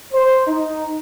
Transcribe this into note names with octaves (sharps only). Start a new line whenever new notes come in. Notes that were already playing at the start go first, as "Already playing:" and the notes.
C5
D#4